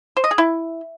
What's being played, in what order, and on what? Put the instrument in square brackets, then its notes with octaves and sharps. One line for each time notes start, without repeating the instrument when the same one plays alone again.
[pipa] C5
D#5
G#4
E4